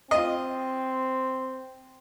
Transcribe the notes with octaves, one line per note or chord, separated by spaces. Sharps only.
C4 F4 D#5